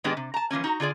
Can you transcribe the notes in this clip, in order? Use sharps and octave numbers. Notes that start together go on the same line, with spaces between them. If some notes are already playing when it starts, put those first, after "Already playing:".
G#2 D#3 G#3 B3 D4 G4
C3
A5 A#5
E3 F3 A#3 C#4
D#4 F#4 A#5
D3 F4 G#4 D5